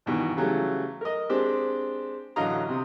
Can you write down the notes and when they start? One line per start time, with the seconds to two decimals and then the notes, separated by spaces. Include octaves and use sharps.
0.06 G2 B2 D#3 E3
0.36 C#3 E3 F#3 G3 A3
1.01 A#4 D#5
1.29 G#3 C4 D4 G4
2.36 A1 D3 F#3 D#5 F5 A#5
2.69 C3 D#6